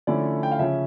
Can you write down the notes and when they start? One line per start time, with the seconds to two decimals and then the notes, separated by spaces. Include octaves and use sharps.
0.07 D3 F3 A3 C#4 E4 D5
0.43 G5
0.52 F5
0.59 C#3 F3 C#4 E5